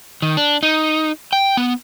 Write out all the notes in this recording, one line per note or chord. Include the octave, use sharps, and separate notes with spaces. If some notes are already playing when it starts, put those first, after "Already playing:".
D#3
D4
D#4
G5
B3